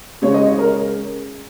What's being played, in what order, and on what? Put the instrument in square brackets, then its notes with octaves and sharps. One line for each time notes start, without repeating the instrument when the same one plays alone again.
[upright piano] C#3 G#3 C#5
D#5
C#5
A#4